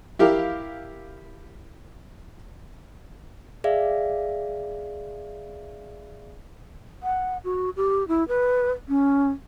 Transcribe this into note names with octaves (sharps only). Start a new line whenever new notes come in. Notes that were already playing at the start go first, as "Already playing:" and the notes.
E4 G4 A#4 F5
G#4 D5 E5 F5
F#5
F#4
G4
E4
B4
C#4